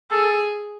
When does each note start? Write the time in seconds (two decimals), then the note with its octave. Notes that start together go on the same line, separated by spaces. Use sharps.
0.11 G#4 A4